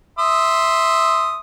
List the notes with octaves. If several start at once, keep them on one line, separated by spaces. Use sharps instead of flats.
E5 C6 D#6